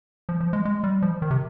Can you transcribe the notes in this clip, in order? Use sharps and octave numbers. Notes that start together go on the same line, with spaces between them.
F3
F3
G#3
G#3
G3
F3
D#3
C3